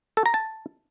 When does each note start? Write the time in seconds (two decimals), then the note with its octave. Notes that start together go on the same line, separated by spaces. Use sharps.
0.17 A4
0.26 A#5
0.34 A5